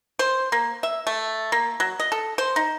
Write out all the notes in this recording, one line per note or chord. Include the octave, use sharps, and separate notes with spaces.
C5
A#3
E5
A3
A#3
F#3
D#5
A4
C5
D#4